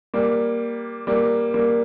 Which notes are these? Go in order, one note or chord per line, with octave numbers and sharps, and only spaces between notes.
G3 A#3
G3 A#3
G3 A#3